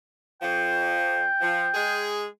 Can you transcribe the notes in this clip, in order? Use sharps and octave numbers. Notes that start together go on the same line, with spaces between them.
F2 F3 G5
F3
G#3 G#4